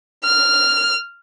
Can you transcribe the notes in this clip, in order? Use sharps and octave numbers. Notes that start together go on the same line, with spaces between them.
F6